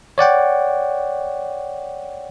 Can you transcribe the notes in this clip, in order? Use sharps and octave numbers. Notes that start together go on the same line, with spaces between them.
C#5 D5 F#5 G5